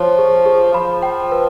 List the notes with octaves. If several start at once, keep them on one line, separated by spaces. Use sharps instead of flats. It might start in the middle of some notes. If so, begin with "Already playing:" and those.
Already playing: F3 C#5
G#4
G#4
F3 B5
G5
B4